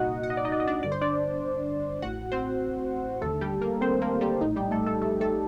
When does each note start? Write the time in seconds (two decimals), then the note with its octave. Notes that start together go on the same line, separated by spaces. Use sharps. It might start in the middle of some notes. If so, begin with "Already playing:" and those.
Already playing: C2 A#2 D#4 F#4 D#5 F#5
0.23 F#5
0.30 D#5
0.37 D5
0.45 D#4 D#5
0.52 D5
0.60 D#5
0.67 D4 D5
0.82 G1 G2 D3 D5
0.92 C5
1.01 D4 D5
2.02 A1 A2 F#4 F#5
2.32 C4 C5
3.21 D#2 D3 A3 A4
3.41 G3 G4
3.61 A#3 A#4
3.81 C4 C5
4.02 A#3 A#4
4.21 G3 G4
4.41 A#1 A2 D#4
4.56 G3 G4
4.71 A3 A4
4.86 A3 A4
5.02 A3 A4
5.21 A3 A4